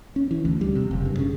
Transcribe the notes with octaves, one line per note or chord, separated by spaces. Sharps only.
C#4
E3
D2
G3
C3
F#1
G2
C#3